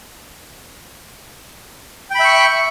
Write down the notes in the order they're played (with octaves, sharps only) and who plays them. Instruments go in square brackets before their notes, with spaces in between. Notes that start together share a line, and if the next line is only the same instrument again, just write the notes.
[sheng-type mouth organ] G5
B5
E5
C#6